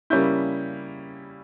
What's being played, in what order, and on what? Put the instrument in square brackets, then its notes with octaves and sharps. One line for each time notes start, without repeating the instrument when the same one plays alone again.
[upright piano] C#3 G3 A#3 C#4 E4 G6